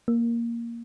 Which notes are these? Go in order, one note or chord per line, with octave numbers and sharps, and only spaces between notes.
A#3